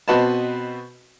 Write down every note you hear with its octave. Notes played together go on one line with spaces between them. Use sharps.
B2 C4 F#4 B4 D#5 A5